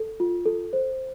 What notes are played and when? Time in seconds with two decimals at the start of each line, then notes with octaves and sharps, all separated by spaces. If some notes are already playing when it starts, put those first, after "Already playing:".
Already playing: A4
0.20 F4
0.46 A4
0.73 C5